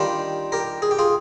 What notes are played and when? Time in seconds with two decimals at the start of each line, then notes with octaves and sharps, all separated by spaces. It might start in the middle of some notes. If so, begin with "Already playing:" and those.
Already playing: D#3 G3 D4 F4
0.52 G4 A#4
0.82 G#4
0.91 G4
0.99 F4 G#4